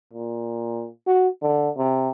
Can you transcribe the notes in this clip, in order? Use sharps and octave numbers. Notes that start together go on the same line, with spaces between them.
A#2
F#4
D3
C3